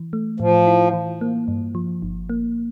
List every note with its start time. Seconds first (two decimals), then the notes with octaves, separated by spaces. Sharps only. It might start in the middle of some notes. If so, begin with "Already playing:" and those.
Already playing: E3
0.13 A3
0.40 A2 F3
0.67 E4
0.94 E3
1.21 A#3
1.48 G2
1.75 F3
2.02 G1
2.30 A#3